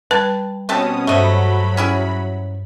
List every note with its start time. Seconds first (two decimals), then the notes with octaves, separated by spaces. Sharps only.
0.11 G3 B4 A5 B5 G#6
0.69 B2 C4 C#4 G4 A5 D#6
1.07 G2 F#3 A3 C5 C#5 D#5 B5
1.77 C#4 E4 G#4